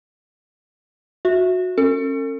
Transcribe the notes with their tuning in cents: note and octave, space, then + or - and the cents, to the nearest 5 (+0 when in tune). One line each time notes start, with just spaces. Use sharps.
F#4 -20 E5 +0
C#4 -30 A4 +40